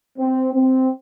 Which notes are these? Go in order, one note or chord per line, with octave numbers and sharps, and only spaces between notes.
C4
C4